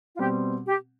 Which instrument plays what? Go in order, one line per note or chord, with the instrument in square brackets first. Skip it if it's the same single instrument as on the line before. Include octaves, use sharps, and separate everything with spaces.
[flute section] F4
[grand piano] B2 G3 C4 [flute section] G4
[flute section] G4